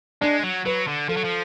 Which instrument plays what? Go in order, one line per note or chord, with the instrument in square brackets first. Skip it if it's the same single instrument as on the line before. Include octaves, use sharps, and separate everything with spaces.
[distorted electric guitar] G#3 [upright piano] D4
[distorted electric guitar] F#3
[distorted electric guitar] F#3 [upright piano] B4
[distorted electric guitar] D3
[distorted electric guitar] F3 [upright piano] A4
[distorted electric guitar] F#3
F3